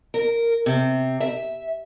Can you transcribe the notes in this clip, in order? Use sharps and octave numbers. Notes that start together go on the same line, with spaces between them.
A#4
C3
E5